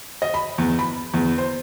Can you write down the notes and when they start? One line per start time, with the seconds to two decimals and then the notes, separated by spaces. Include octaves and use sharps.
0.22 D#5
0.34 B5
0.58 E2
0.79 B5
1.14 E2
1.38 C5